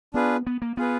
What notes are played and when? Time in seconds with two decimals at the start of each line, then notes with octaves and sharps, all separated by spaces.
0.14 B3 D4 F4 G#4 B4
0.47 B3
0.62 A#3
0.77 B3 F4 G#4 B4